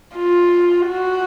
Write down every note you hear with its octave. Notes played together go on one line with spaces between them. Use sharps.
F4
F#4